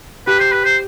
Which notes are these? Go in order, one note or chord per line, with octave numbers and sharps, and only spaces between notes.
G4 B4
C5
B4
C5